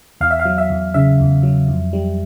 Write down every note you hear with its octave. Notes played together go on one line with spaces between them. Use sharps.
E2 F5
E5
F5
F#3
E5
E2
C#3 E5
E2
F#3
F2
G3